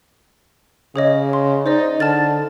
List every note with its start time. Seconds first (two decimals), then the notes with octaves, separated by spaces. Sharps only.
0.96 C#3 G#4 C#5 D#5
1.33 C6
1.66 D#4 C5 D5 D#5
2.00 D3 A5 F6 A6